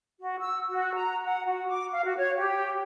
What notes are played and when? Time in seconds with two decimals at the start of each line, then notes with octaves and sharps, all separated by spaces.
0.19 F#4
0.39 E6
0.69 F#4
0.94 A#5
1.24 F#5
1.46 F#4
1.69 D6
1.92 F5
2.04 F#4
2.17 C#5
2.38 G4